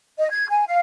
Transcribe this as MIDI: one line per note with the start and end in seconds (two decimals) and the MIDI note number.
0.19 0.29 75
0.30 0.47 92
0.48 0.64 80
0.66 0.80 77